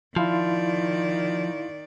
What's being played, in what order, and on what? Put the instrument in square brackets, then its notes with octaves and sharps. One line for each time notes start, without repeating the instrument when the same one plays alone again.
[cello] D#3 D5 [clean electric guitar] F3 [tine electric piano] E4 F5 C6